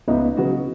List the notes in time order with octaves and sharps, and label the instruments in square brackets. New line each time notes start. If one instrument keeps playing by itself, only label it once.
[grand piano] C#2 [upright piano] B3 D#4
[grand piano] C#3 F#3 B3 F#4